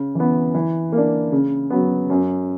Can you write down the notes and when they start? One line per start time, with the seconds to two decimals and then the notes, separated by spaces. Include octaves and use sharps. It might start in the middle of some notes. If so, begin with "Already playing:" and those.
Already playing: C#3
0.15 E3 B3
0.54 E3
0.92 A#3 D4
1.32 C#3
1.70 F#3 B3
2.10 F#2